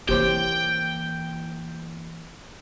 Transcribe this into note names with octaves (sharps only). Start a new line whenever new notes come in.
E3 A#3 G4 C5 C#5 G5